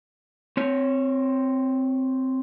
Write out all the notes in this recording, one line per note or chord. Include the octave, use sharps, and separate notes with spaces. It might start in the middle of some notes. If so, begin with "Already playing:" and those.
C4 C#5